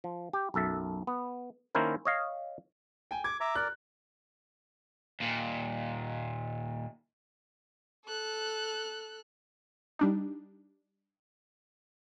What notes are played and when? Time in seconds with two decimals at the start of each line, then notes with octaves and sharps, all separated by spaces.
0.04 F3
0.33 G4
0.54 B1 F#2 A4 E5
1.07 B3
1.75 D#3 A#3 C#4 E4 A#4 C5
2.05 C#5 D#5 F5
3.11 G5 G#5
3.24 D6 G#6
3.40 E5 A#5 D6
3.55 A#4 D5 F#6
5.20 D#2 A#2
8.05 A4 F#6
9.99 G3 D4 D#4